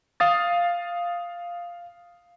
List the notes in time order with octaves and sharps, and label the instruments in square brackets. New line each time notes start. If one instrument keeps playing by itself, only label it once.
[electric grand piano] F5 D#6 A6